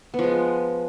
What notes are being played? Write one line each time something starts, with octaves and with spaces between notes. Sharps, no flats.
F3 G#3 B3